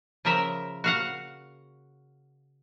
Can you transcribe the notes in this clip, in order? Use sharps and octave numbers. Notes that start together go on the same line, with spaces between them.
C#3 F3 A#4 E5
F#4 F5 F#5